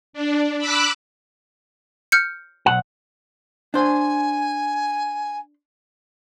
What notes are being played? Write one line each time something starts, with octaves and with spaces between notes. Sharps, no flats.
D4
B5 D6 E6 F#6 B6
F6 G6 C#7
B1 E2 F#5
D4 C5 G#5